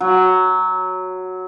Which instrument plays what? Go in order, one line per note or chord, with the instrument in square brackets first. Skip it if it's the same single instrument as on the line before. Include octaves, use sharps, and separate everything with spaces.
[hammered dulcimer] F#3